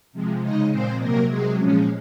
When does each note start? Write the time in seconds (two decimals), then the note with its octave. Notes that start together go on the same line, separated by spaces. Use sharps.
0.13 C3 F3 G#3
0.41 C#3 G#3 D#4 D#5
0.71 A#2 F3 G#3 C4 C5
1.00 C3 F#3 A#3 A#4
1.29 C3 F#3 G#3 G#4
1.58 A#2 F3 G#3 C#4